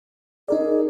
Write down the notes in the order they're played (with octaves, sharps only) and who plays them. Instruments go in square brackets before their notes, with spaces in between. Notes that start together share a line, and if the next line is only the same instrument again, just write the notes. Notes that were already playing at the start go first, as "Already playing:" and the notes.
[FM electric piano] D#4 A#4 D5 [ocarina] G#4